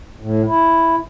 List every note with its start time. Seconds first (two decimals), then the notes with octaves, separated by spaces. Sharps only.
0.20 A2
0.46 E4